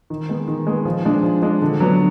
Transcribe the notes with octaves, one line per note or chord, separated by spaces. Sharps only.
D#3
G#3 B3
D#3
G#3 B3
F3
G#3 D4
F3
G#3 D4
D3
F#3 B3 D4